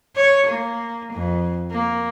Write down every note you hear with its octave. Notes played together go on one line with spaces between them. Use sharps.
C#5
A#3
F2
A#3